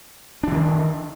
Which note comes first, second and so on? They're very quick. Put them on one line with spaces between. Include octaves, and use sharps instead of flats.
D4 E3 D#3